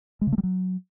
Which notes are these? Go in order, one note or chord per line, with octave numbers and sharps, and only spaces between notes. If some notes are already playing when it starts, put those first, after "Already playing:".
G#3
C#3
A3
G3
F#3